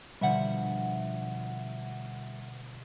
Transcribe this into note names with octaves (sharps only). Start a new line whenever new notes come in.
B2 D3 F3 G3 E5 F#5